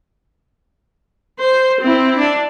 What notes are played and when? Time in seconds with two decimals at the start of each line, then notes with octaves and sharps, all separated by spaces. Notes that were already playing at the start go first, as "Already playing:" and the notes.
1.40 C5
1.81 C4 E4
2.19 D4